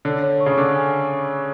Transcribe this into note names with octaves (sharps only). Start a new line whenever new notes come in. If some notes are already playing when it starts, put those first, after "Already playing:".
D3 C#5
C#5
C#6
C#3
D3 D6
G#5